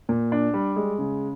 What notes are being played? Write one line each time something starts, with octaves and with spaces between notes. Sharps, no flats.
A#2
D4
G3
G#3
C#3